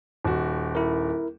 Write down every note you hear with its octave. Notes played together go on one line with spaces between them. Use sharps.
D#1 F#4
E4 A#4